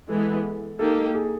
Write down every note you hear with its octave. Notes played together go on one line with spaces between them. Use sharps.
E3 G#3 B3 A4
A#3 D#4 G4 A4
G#4
A4